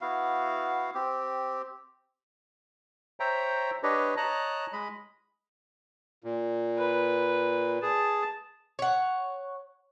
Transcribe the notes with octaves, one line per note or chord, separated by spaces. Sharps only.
B3 E4 F#4 F5
C4 G4
C5 C#5 E5 G5 A#5
D4 G4 B4 C#5 D#5
C#5 D#5 A5 A#5 F#6
G#3 D#5 B5
A#2
B4
G#4 A5
C#5 F#5